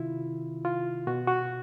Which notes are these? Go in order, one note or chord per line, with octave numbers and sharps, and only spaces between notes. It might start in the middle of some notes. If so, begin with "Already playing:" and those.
Already playing: C3 D#3 E4 F4
F4
B2 F#4
F#4